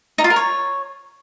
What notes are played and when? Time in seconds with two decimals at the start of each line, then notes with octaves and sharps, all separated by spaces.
0.18 D#4
0.24 F4
0.30 A#4
0.36 C#5